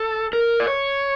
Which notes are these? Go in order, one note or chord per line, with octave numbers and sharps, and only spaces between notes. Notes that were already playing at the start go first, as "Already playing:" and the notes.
Already playing: A4
A#4
D5
C#5